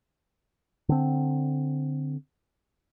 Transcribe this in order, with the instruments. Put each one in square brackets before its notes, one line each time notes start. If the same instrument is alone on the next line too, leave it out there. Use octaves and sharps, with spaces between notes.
[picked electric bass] D3 C4